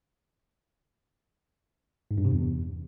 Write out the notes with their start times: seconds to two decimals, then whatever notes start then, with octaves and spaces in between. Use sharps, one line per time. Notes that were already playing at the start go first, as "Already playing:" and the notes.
2.11 G#2
2.18 G2
2.25 C3
2.32 E2